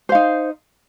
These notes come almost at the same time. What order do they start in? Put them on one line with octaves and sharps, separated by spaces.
C5 F5 D#4